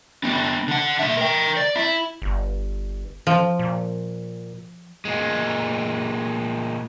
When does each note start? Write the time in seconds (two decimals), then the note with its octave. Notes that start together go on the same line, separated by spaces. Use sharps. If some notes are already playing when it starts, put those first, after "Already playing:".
0.24 B3 D4
0.68 D3 F#5
0.99 A#2 E5
1.17 A#4 G5
1.57 D5
1.76 E4
2.22 G1
3.27 F3
3.59 A#2
5.05 A#2 G#3